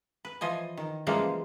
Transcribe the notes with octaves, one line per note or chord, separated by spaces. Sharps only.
B4
E3 F3 D#5 G#5
D#3
C#3 E3 F3 G3 G#3 A#3